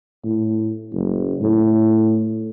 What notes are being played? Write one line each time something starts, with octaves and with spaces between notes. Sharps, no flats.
A2
F#1
A2